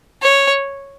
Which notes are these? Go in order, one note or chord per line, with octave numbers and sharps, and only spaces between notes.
C#5